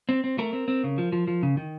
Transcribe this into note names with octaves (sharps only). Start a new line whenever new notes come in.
C4
C4
A3 A#4
C4
C4
C#3
F3
F3
F3
C#3
D#3